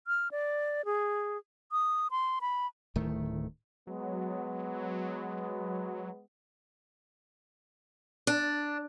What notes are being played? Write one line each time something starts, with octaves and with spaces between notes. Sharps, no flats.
F6
D5
G#4
D#6
C6
B5
D1 A2 D#3 A3
F#3 G#3 B3
D4